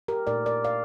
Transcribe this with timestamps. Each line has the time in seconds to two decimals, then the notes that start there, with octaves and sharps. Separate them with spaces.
0.08 G4 A#4
0.27 A#2 A3 D#4 A#4 D5
0.46 A#4 D5
0.64 D5 F5